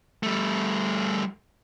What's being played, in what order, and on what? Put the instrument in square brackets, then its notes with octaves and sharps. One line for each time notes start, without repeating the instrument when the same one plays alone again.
[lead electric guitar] G3 A3